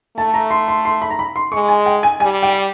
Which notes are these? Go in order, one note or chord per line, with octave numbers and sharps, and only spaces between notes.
A3 A5
A#5
C6
C6
C6
B5
A#5
B5
C6
G#3 C#6
G#5
G5
G#5
G3 G#5
G5